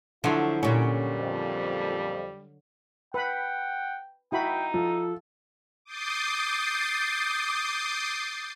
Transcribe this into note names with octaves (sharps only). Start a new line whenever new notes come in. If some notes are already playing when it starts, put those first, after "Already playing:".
D3 F3 F#3 A3 E4
A#2 G3 C#4
F2
B4 F#5 G5 B5
D#4 E4 F#4 G5 B5
F3 A4
D6 D#6 G6 A6 C7